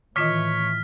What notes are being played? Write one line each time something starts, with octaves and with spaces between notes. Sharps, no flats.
A2 D#3 E3 F4 C#5 D#5 F6 B6